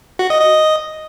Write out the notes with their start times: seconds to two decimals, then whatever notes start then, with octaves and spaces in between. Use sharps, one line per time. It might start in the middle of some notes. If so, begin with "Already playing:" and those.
0.19 F#4
0.30 D#5
0.41 D#5